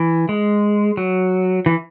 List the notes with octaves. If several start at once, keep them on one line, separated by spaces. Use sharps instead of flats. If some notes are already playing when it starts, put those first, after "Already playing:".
Already playing: E3
G#3
F#3
E3